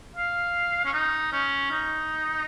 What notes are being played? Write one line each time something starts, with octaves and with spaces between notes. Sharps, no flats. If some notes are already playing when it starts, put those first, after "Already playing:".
F5
C#4
D#4
C#4
D#4